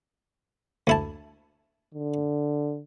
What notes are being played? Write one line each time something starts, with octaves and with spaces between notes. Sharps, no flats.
D2 E4 A5
D3